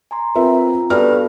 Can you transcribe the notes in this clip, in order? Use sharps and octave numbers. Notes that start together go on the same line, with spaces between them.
G#5 A#5 C6
C4 F4 A#4 B4 E5 A#5
G2 B3 F#4 A4 B5 F6